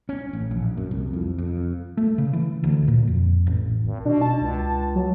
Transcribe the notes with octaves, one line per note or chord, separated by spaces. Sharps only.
C#4
A1
A#1
F#2
C2
F2
F2
A3
C#3
E3
D2
A#2
F2
A1
G#1
B2 D4
A5
C#2
F#3